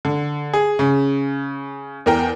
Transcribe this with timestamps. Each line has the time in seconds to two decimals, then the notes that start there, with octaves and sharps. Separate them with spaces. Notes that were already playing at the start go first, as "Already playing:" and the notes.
0.05 D3
0.54 G#4
0.79 C#3
2.06 E2 A#4 G5